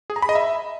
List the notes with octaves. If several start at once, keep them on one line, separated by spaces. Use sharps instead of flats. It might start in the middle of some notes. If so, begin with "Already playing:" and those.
G#4
A#5
B5
D#5
E5